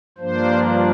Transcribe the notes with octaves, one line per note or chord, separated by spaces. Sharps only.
G2 F3 A#3 D4 C5